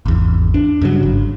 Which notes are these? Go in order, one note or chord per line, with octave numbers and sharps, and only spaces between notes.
G#1 E2
D4
G2 C#3 F#3
G#1